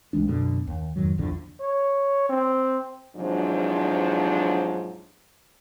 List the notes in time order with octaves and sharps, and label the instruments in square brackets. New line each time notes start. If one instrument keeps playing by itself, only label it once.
[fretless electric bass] C2 E3 G#3 D4
F#2 B2 D3
D#2
F2 G#2 D#3 F#3
A#1 E2 D3 F3
[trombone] C#5
C4
[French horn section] E2 G#2 C3 F3 F#3 D4